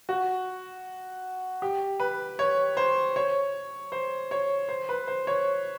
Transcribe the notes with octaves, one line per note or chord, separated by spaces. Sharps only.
F#4
G4
B4
C#5
C5
C#5
C5
C#5
C5
B4
C5
C#5